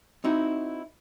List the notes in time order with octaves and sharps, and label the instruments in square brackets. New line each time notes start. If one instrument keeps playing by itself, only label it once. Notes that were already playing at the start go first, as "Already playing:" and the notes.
[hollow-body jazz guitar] C4 D#4 E4 F#4